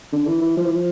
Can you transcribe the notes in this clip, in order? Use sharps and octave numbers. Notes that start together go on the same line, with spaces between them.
D3
E3
E3
F3
E3
F3